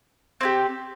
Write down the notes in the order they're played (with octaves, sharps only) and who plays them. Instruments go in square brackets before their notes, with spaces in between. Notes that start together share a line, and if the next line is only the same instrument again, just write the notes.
[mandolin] C4 E4 G4